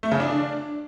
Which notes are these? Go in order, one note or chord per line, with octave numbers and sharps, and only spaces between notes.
A3
C#3
D4